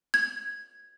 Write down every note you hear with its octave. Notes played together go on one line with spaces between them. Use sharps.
G#6